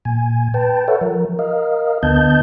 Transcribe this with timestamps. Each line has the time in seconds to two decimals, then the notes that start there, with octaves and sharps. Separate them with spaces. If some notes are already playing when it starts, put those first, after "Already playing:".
0.05 A#2 G#5
0.54 B4 G5 A5
0.88 A4 B4 C#5 E5 F#5
1.01 F3 A#4
1.39 A#4 D#5 F5
2.03 D2 D3 B3 D#5 A5 G6